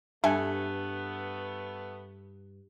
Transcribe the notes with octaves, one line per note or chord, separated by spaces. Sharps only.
G2 A3 B3 A4 E5 G#5